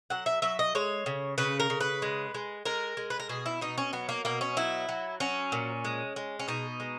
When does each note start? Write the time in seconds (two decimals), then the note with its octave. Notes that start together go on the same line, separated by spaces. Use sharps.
0.10 F#3 F#5
0.26 E5
0.42 F#3 E5
0.59 D#5
0.75 G#3 C#5
1.06 C#3
1.38 C#3 B4
1.60 A#4
1.70 C#3
1.80 B4
2.02 G#3
2.34 G#3
2.65 G#3 A#4
2.97 G#3
3.10 B4
3.20 A#4
3.29 B2 G#4
3.46 E4
3.61 B2 D#4
3.78 C#4
3.93 F#3 B3
4.09 A#3
4.25 B2 A#3
4.41 C#4
4.57 F#3 E4
4.89 F#3
5.20 F#3 C#4
5.52 A#2
5.85 G#3
6.16 G#3
6.39 C#4
6.48 B2 D#4
6.80 G#3